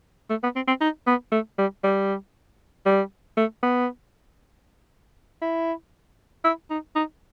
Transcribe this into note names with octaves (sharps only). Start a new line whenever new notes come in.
A3
B3
C4
C4
D#4
B3
A3
G3
G3
G3
A3
B3
E4
E4
D#4
D#4